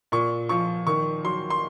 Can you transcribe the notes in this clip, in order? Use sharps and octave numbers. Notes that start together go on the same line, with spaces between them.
A#2 C#6
F3 C#6
D#3 C#6
F#3 C6
C6